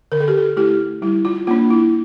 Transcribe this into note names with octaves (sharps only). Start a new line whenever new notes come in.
D3 A#4
A4
G4
A4
A3 E4 G4
G3 E4
F4
A#3 D4 F4
E4